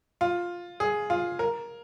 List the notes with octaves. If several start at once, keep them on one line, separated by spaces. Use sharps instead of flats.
F4
G#4
F4
A#4